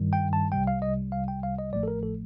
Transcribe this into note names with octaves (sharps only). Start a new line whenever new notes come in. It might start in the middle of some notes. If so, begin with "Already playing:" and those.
Already playing: G2 D#3 G3
G5
A5
C2 C3 G3 G5
F5
D#5
F5
G5
F5
D#5
A1 A2 F3 A3 D5
A4
A#4
A4